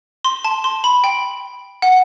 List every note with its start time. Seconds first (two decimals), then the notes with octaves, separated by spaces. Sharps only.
0.25 C6
0.45 A5
0.64 C6
0.84 B5
1.04 G5
1.82 F#5